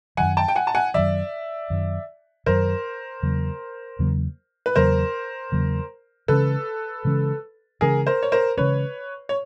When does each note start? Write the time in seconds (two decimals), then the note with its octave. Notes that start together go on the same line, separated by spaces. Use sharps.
0.17 F#2 D#3 F#3 F#5 G#5
0.37 G5 A5
0.48 G5
0.56 F#5 G#5
0.67 A5
0.75 F#5 G#5
0.94 F#2 D#3 F#3 D5 E5
1.70 F#2 D#3 F#3
2.46 F#2 D#3 F#3 A#4 C5
3.22 E2 C#3 F#3 A#3
3.99 E2 C#3 F#3 A#3
4.66 B4
4.76 E2 C#3 F#3 A#3 A#4 C5
5.52 E2 C#3 F#3 A#3
6.28 C#3 E3 G#3 C#4 A4 B4
7.05 C#3 E3 G#3 C#4
7.81 C#3 E3 G#3 C#4 G#4 A#4
8.07 A#4 C5
8.23 C#5
8.32 A#4 C5
8.57 C#3 E3 G#3 C#4 B4 C#5
9.29 C#5